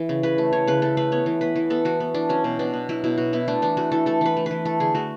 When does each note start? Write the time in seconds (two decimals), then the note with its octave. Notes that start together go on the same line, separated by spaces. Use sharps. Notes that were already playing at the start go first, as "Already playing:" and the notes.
Already playing: E3
0.09 C#3
0.23 C#3 B4
0.38 A3
0.53 E3 C#5
0.67 C#3 B4
0.82 C#3 A4
0.97 A3 B4
1.12 B3 C#5
1.26 E3
1.41 B3 B4
1.56 E3
1.70 B3 A4
1.85 E3 F#4
2.00 B3
2.14 E3 D4
2.29 F#3 C#4
2.44 B2
2.59 B2 D4
2.73 B3
2.89 F#3 E4
3.04 B2 E4
3.18 B2 F#4
3.33 B3 E4
3.48 A3 D4
3.62 E3 D4
3.77 A3 F#4
3.92 E3 A4
4.06 A3 A4
4.21 E3 B4
4.37 A3
4.46 E3 B4
4.65 A3 A4
4.80 D3 G#4
4.95 A3 F#4